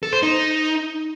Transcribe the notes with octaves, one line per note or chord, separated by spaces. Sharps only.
A4
C5
D#4